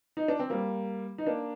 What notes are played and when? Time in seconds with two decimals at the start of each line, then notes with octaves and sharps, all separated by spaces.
0.17 D#4
0.28 D4
0.39 C4
0.50 G3 A#3
1.18 D#4
1.26 A#3 D4